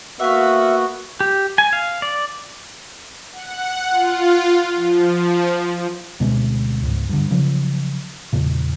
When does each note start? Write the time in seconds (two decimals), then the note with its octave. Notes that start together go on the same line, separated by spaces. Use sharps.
0.20 A#3 B3 F#4 E5 F5
1.20 G4
1.58 G#5
1.73 F5
2.02 D5
3.32 F#5
3.91 F4
4.76 F3
6.20 D2 B2 G#3 C4
6.83 C#2 G#2
7.09 G2 D3
7.31 C#3 F3 F#3
8.33 E2 A#2 C#3